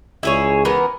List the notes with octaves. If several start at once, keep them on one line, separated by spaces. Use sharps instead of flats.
C#2 E4 G#4 C#5
E3 B3 A#4